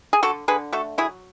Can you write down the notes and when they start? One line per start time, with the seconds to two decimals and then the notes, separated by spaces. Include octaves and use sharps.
0.13 G#4
0.23 D3 F#4 A4
0.48 D3 G#4 B4
0.73 A3 F#4 A4
0.98 F#3 E4 G#4